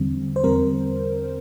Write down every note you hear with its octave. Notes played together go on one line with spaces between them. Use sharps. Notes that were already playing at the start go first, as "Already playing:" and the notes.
Already playing: E2 D3 G3 C4
C5
E2 D3 G3 C4 A#4